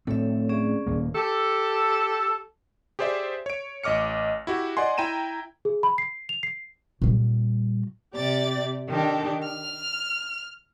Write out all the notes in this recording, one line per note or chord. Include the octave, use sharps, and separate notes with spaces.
A2 C4 A4 C#5 E5
C#4 G#4 D5
D#1 A#3
G4 A4
G4 G#4 C5 D5 E5
C#5 D7
A1 D#5 D6 F6 C#7
E4 F#4 G4
D5 D#5 F#5 G#5 C6
E4 G5 A#5 D#7 E7
G#4
B5
C7
F7
C7
A#2 G3
C3 G4 D5 A6
D#3 D4 G4 A4
F6